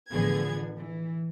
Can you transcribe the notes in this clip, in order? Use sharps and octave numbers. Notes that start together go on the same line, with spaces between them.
A1 D3 F3 B3 G#4 G#6
E3